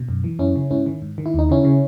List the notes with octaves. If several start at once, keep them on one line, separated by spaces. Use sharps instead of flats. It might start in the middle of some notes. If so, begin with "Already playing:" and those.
Already playing: B2
F#2
E3
F#2 C#4 E4
C#3
G#2 C#4 E4
D#3
G#2
D#3
E4
D#2 D#4
C#3 C#4 E4
C#3